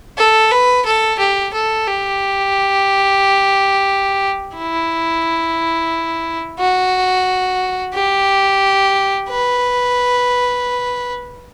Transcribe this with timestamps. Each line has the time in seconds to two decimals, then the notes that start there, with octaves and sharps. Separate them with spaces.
0.18 A4
0.51 B4
0.85 A4
1.19 G4
1.53 A4
1.86 G4
4.56 E4
6.59 F#4
7.94 G4
9.29 B4